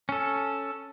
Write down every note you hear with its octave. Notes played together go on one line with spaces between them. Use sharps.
C#4 A4